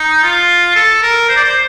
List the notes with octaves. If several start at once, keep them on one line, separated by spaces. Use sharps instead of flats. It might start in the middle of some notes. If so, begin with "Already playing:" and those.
Already playing: D#4
F4
A4
A#4
C5
D5
C5